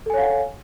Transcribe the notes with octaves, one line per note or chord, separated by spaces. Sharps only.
A4 C#5 F5 F#5 G#5